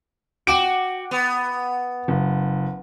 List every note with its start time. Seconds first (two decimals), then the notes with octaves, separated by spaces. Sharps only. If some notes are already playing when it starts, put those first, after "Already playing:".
0.47 F#4 G5 D6 D7
1.11 B3
2.08 F#1